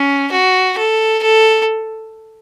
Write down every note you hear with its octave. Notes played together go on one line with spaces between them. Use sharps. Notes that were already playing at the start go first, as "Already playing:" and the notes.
Already playing: C#4
F#4
A4
A4